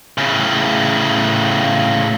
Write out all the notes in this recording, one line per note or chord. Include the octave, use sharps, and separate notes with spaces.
A2 C#3